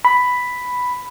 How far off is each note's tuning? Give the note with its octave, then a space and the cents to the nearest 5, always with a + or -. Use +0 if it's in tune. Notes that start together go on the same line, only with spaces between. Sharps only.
B5 +5